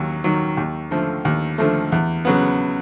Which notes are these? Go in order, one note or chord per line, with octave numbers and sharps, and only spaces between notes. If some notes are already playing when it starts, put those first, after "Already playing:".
Already playing: D#2 D#3 F#3
D#3 F#3
D#2
D3 F3 A3
D#2
D3 F3 A3
E2
C#3 F#3 B3